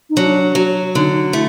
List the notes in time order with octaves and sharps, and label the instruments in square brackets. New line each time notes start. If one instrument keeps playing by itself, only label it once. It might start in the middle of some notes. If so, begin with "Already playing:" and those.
[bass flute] D#4
[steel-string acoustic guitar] F#3 [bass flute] D4
[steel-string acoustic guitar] F#3
[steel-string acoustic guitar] D3 [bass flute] D#4
[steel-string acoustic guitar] A3 [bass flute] E4